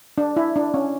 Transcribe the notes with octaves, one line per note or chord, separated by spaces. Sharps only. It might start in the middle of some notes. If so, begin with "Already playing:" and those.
D4
E4
D4
C#4